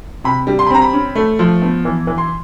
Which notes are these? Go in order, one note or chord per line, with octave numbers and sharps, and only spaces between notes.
C3 B5
G3
C6
B5
C4 A#5
B5
C#4
A3
F3
B3
E3
E3
C6